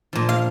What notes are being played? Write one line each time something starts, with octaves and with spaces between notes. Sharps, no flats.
A#2 F3
F5